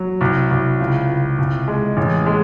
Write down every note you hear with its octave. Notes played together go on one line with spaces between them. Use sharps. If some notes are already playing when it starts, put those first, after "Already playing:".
Already playing: F#3
C2
C2
C#2
C#2
C2
G#3
A1
G#3